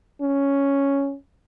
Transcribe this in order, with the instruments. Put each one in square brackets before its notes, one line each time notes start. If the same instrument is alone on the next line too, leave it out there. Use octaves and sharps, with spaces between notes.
[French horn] C#4